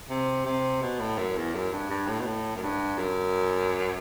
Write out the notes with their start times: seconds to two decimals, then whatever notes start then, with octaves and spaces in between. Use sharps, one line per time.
0.10 C3
0.45 C3
0.82 B2
1.00 A2
1.18 F#2
1.37 E2
1.54 F#2
1.72 G2
1.90 G2
2.08 A2
2.20 B2
2.26 A2
2.56 F#2
2.63 G2
2.98 F#2